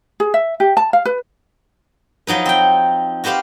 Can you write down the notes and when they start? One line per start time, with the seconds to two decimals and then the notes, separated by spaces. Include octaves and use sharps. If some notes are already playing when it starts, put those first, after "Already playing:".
0.20 G#4
0.34 E5
0.60 G4
0.77 A5
0.93 F5
1.05 B4
2.27 F3 F#3 D#4 B4
2.46 C4 G5
3.24 F#4 G4 B4 C5 F5